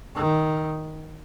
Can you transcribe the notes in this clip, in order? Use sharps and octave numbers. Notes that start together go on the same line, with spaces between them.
D#3